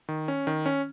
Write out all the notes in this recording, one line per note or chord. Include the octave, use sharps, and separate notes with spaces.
D#3
C#4
D#3
C#4